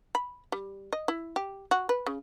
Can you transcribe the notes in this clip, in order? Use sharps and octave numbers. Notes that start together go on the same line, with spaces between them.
B5
G3
D#5
E4
G4
F#4
B4
C#3